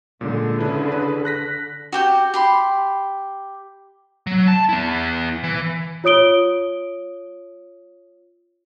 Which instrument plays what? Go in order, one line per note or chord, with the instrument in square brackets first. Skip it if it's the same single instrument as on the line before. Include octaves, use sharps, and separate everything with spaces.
[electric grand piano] A#2 G#3 [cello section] D3
[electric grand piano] C#3 E4 B4
G#4 B4
F#6 A#6 B6
[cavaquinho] F#4 G4 G5
G4 B5 C6
[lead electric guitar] F#3
A5
B3 E4
E3
[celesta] F4 C#5 D#6 D7 G7